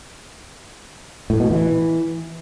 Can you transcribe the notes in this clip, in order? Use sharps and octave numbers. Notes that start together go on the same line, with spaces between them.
A2
B2
E3